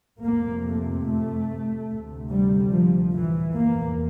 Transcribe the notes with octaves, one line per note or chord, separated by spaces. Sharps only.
F2 C3 A#3
A3
A3
D2 C3
G3
F3
E3
E2 C3 A#3